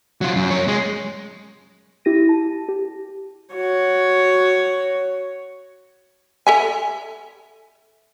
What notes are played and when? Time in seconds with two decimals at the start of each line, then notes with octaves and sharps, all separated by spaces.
0.21 F#3 F4
0.36 F#2
0.50 F#2 C#5
0.68 G#3
2.05 E4 G4 A#6 D#7
2.29 A5
2.69 G4
3.54 F#4 C#5
6.47 A4 E5 G#5